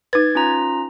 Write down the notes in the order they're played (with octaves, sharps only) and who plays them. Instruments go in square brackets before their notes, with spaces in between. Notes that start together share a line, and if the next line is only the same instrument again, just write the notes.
[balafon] D#4 B4 [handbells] G#6 A6
[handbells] C#4 F4 A#5